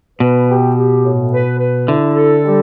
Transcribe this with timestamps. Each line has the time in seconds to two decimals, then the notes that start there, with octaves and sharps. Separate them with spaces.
0.20 B2 B4
0.49 G4
0.76 G4
1.05 A2
1.32 B4
1.59 B4
1.88 D3 E4
2.16 A4
2.44 G3